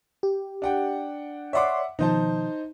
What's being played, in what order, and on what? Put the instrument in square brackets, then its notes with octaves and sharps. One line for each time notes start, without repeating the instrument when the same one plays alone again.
[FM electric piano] G4
[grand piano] D4 F#5 G5
[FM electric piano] C#5 D5 C6 [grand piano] E5 F#5 D6
[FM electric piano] B2 D#3 F3 [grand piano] D#4 C5 A5